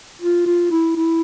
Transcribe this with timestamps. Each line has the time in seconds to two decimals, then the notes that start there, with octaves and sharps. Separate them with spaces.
0.22 F4
0.46 F4
0.71 E4
0.96 E4